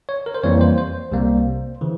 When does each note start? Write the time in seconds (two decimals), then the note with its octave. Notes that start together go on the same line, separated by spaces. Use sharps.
0.09 C#5
0.26 A#4
0.35 C5
0.43 F2 E3 G3 A#3 C#5
0.61 C5
0.78 C5
1.12 C2 C3 G3 A#3
1.81 C#3 E3